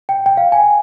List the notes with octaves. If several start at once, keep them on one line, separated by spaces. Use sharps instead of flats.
G5
G5
F5
G#5